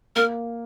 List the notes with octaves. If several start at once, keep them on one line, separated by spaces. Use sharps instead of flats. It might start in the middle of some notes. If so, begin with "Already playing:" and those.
A#3 A#4